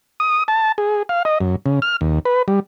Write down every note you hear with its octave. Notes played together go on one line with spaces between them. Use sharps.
D#6
A5
G#4
F5
D#5
F#2
C#3
F6
D#2
B4
G3